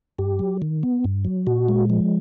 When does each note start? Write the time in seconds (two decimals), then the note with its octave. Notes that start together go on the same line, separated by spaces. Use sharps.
0.19 G2 G4
0.39 F#3
0.62 D#3
0.83 B3
1.04 G2
1.25 F#3
1.47 A#2 F#4
1.69 G#3
1.90 F3